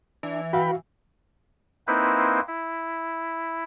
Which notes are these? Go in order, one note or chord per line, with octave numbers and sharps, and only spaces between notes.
E3 D4
F#4 B4 F5 G5 B5
A#3 C4 D#4 E4 B4 C5
E4